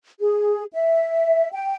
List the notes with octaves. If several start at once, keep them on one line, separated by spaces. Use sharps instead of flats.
G#4
E5
G5